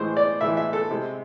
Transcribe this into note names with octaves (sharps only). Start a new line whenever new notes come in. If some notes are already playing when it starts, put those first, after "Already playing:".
Already playing: A2 E3 G#3 C5
D5
A2 E3 G#3 E5
E5
A4
C3 G#3